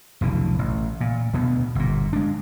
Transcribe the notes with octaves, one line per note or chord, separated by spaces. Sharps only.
F1 B1 D3 E3
A1
A#2
D2 B2 B3
G1 A#2
G#3 D4